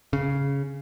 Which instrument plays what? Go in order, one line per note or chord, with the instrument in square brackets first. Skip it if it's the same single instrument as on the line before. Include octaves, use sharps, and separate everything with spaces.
[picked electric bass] C#3